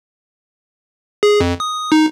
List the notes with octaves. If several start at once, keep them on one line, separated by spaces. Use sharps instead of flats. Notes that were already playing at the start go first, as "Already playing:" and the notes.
G#4
F2
D#6
D#4